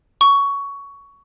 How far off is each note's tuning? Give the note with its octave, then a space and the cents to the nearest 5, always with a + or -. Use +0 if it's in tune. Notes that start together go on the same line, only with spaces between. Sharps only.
C#6 +15